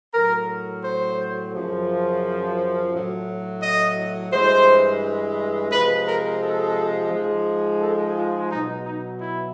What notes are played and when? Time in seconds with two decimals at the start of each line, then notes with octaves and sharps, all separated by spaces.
0.13 A2 F#3 A#4
0.84 C5
1.53 F#2 C#3 F3
2.92 A2 F#3
3.62 D#5
4.31 G2 E3 G#3 C5
5.71 C3 F3 G#3 B4
6.06 A#4
6.41 A4
7.11 G#2 F3 G#3
7.80 A4
8.16 F4
8.50 B2 F#3 D#4
8.85 D#4
9.20 E4